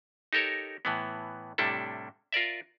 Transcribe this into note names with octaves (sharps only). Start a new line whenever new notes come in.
D#4 G4 A4 A#4 C#5
A2 E3 B3
A2 C3 G3 D4 E4 A4
F4 A#4 D5 E5